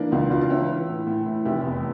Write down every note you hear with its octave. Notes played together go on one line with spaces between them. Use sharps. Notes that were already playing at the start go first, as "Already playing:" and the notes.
Already playing: E3 A#3 D4
C#2 D4 F4
C#2 D4 F4
F4
E3 C#4 E4
E3
A2
A2
A2
F1 E4 G4
E2